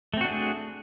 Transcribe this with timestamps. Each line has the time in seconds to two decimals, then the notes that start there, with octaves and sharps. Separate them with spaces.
0.14 A3
0.17 C4
0.21 F#4
0.25 D4
0.28 G#4